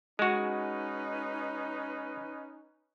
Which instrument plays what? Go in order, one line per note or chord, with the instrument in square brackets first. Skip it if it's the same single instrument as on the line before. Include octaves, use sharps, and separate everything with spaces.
[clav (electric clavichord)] G#3 F#4 [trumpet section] C#4 D#4 B4